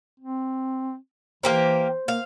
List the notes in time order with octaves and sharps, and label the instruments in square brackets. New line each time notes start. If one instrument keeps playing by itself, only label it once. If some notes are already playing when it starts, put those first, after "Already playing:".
[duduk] C4
[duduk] E3 [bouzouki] A#3 G4 A#4 [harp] C5
[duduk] A#3 [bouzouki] F5